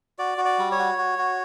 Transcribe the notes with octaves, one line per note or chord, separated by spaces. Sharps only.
F#4 D5
F#4
D5
G3
C#5
F#4
F#4
F#4